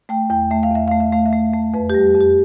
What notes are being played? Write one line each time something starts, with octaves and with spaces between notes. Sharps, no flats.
A3 G5
E2 G5
A3 E5
F5
E2 E5
A3 F5
E5
A3 F5
E5
A3
A3
F2 B4
G3 G4
F2
G4